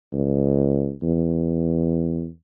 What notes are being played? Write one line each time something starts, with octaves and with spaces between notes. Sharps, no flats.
C#2
E2